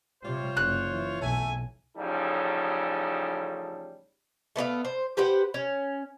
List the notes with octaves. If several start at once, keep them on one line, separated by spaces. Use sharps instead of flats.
C3 G3 F4 C5 C#5
F#1 F#6
E3
B1 A3 E5 G#5
A1 C#3 F3 G3 D#4 A4
A3 B3 C#5 F5
C5
G4 B4 C5 F#5
C#4